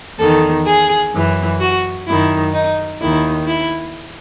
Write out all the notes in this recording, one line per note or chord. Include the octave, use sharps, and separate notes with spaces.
E2 D#3 A4
G#4
F#2 E3
F#4
F#2 D#3 E4
D#4
D#2 D#3 E4
E4